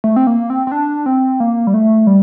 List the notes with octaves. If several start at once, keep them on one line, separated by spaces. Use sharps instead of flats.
A3
C4
A#3
C4
C4
D4
C4
A#3
G3
A3
G3